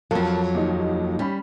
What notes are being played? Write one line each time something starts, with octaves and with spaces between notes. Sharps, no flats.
F2 F#3 A#4 F5 A5
D#2 D#4
G3 C#4 B5